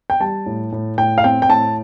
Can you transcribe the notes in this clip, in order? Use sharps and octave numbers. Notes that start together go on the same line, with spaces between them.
G5
G3 A5
A2
A2
A2 G5
F5
C4 G5
G5
A2 A5